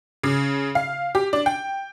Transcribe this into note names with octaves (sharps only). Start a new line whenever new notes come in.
C#3
F5
G4
D4
G5